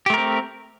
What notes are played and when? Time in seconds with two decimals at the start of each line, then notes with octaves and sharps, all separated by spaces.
0.06 G4
0.10 A3
0.14 A#4
0.17 C4